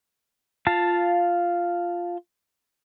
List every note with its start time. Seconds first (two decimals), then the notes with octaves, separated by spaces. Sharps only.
0.67 F4 F5 A5